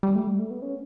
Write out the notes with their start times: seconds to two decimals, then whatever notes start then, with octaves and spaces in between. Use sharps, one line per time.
0.03 G3
0.15 A3
0.27 G3
0.39 A3
0.51 B3
0.62 C#4